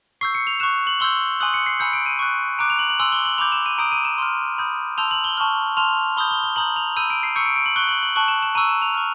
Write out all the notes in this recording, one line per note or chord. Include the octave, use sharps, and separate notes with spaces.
C#6 E6 G6 C7
C#7
F7
C#6 F#6 E7
F#7
C6 E6 G6 G7
G#5 C6 D#6 F#6 F#7
C#7
C7
G#5 B5 E6 G6 C#7
D7
D#7
C#6 F#6
A#5 D6 F#6 D7
F7
F#7
F#7
G#5 C6 E6 F#7
G7
F#7
B5 D6 G6 F7
E7
D#7
A#5 D#6 G6 D7
D#7
E7
C6 F6
B5 D#6 G6
A5 C6 E6 G6 F7
F#7
G7
A5 C#6 F6
A5 C6 F6 F7
B5 D#6 G6 G7
G7
G7
A#5 D#6 G6 F#7
F7
B5 E6 G6 D#7
D7
C7
C#6 E6 G6 C#7
D7
D7
F#7
C#6 F#6 G7
F#7
F#7
A5 C#6 F#6 F#7
E7
E7
A#5 C#6 E6 D#7
E7
F7
C#6 F6